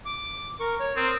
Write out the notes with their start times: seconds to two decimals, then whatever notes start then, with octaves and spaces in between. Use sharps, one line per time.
0.06 D6
0.60 A#4 C#6
0.80 C#5
0.97 C4 A#4 D#6